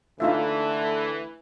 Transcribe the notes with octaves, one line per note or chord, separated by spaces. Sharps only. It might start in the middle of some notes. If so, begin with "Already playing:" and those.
D3 E3 A3 D#4 F4 E5